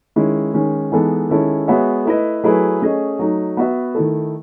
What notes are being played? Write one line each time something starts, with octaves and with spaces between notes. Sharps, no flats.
D#3 G#3 C#4 E4
D#3 G#3 C#4
E3 G#3 B3 D#4 A4
D#3 G#3 C#4 E4 A4
G#3 B3 F#4 C#5 E5
A3 E4 B4 D#5
F#3 A3 E4 G#4 B4
A3 C#4 G#4 D#5
F#3 A3 D#4
B3 F#4 B4 E5
D#3 A3 E4 A4